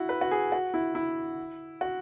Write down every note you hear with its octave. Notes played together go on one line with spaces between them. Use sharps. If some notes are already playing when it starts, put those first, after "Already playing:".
Already playing: E4 F#4
B4
F#4
G#4
F#4
E4
E4
F#4